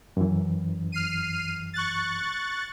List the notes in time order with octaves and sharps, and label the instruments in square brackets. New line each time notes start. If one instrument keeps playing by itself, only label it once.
[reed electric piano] F#2 E3
[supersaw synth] F6 C7 D#7
C#6 F#6 A6